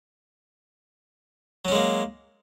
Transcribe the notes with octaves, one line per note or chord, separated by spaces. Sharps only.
F#3 G#3 A#3 C#4